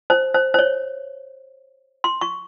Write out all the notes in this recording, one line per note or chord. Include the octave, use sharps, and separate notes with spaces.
C5
C5
C5
C#5
C6
C#6